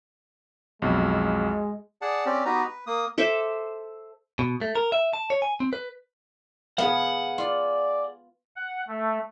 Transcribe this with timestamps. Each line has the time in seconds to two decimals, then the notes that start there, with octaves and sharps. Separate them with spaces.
0.82 B1 F2 G#3
2.02 G#4 D5 F#5 A5
2.26 C4 C#4 G4 D5
2.45 B3 D#4 F#4 G4 B4 A#5
2.64 B4
2.87 A#3 D#6
3.18 A4 C5 E5 D6
4.39 B2
4.61 A3
4.75 A#4
4.92 E5
5.13 A5
5.30 C#5
5.42 G#5
5.60 C4
5.73 B4
6.78 B3 G#4 F5 F#5
7.38 F4 D5
8.56 F#5
8.88 A3